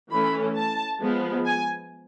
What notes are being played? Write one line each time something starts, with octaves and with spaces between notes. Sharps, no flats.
E3 A3 C#4 B5
A5
F3 G#3 B3
G#5